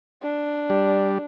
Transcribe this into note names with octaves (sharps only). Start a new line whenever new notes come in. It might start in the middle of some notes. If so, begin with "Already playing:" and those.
D4
G3